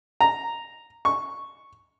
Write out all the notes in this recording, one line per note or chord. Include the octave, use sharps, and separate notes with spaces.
A#5
C#6